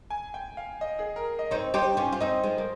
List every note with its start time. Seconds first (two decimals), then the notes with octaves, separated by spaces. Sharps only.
0.10 G#5
0.34 G5
0.57 F5
0.81 D#5
0.99 G#4
1.16 A#4
1.39 D#5
1.51 C4 D#4 C#5
1.74 D#4 G4 C5
1.97 C#4 F4
2.12 F4
2.20 C4 D#4 D#5
2.44 F3 G#3
2.58 A#3